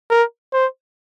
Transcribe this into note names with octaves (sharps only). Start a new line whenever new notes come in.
A#4
C5